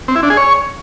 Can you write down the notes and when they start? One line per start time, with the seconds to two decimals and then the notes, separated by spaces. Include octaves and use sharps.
0.08 C4
0.16 E4
0.23 D4
0.30 G#4
0.37 C#5